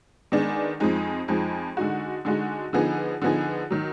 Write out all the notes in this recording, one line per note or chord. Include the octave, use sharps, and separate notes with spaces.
D#3 G#3 B3 D4 G#4
F2 F3 G#3 D#4
F2 F3 G#3 D#4
D3 G#3 D#4 F#4
D3 G#3 D#4 F#4
D3 F3 B3 D#4 G#4
D3 F3 B3 D#4 G#4
D#3 F#3